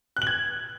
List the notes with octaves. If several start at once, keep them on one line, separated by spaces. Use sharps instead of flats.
F#6
F#7
G#6